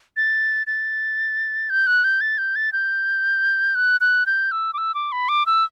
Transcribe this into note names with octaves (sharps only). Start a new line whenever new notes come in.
A6
A6
G6
F#6
G6
A6
G6
A6
G6
F#6
F#6
G6
E6
D6
E6
D6
B5
D6
E6